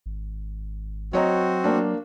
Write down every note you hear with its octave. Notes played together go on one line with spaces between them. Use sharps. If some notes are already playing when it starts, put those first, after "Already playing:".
G#1
F#3 C4 F#4 C#5 D#5 A#5
A#3 D4